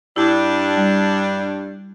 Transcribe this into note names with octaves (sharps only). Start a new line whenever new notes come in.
G2 D4 E4
G3